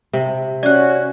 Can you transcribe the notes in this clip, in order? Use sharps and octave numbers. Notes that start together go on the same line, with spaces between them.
C3
C#4 F#4 D5 F#6